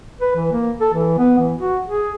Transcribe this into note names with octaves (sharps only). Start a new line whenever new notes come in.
B4
E3
A#3
A4
E3
B3
E3
F#4
G#4